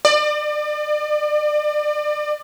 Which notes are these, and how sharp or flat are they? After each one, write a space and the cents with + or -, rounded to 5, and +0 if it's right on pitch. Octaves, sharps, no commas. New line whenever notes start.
D5 +35